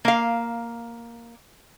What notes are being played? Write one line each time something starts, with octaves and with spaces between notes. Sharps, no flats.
A#3 F5